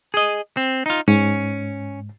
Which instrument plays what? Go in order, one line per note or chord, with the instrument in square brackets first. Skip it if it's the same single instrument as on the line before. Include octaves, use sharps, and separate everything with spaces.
[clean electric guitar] G#4 D#5
C4
D#4 F4
[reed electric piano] G#2 [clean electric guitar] C#4